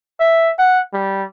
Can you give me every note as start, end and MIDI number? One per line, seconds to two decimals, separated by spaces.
0.20 0.52 76
0.59 0.82 78
0.93 1.23 55